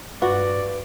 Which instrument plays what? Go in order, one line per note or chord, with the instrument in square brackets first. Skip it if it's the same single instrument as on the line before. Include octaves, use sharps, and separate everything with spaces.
[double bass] G2 [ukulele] F#4 [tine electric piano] B4 [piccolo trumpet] D5